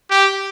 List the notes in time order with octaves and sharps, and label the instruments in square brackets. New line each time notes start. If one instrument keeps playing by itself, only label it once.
[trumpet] G4